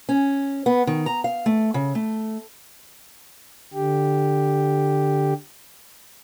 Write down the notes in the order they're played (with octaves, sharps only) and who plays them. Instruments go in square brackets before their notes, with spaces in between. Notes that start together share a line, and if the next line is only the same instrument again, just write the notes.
[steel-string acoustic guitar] C#4
B3
D#3
A#5
F5
A3
C#3
A3
[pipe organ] D3 G4